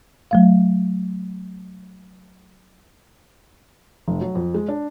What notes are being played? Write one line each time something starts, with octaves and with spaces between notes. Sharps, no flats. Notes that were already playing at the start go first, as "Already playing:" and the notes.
F#3 A3 F5
F1
F#3
F2
G#3
D4